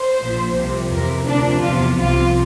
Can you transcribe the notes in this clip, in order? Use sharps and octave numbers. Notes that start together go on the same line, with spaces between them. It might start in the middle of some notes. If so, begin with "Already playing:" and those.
Already playing: C5
A#1 A#2 F3
C2 C3 F3
F2 C3 E3 A#4
D2 C3 F3 D4
E2 C3 F3 F4
C2 C3 F3 F4